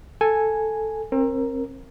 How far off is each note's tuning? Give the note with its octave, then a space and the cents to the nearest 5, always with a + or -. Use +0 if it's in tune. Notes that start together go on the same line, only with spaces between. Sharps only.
A4 +0 G#5 +0
C4 +35 A#4 +0